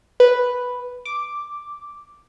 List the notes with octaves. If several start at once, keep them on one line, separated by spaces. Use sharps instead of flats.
B4
D6